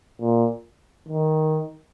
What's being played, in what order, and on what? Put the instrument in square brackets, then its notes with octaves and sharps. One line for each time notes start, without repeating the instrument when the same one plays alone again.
[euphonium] A#2
D#3